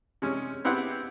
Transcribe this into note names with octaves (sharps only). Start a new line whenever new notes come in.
C3 G#3 C#4
B3 C4 E4 G4 F#5